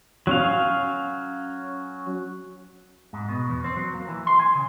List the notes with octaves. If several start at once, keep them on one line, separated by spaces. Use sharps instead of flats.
F#3 C#4 F5
G#2
B2
E2
C4
F#3
A#3
E3
C6
G#5
C#3